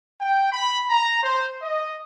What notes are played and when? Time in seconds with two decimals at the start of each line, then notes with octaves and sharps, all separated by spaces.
0.20 G5
0.52 B5
0.89 A#5
1.22 C5
1.62 D#5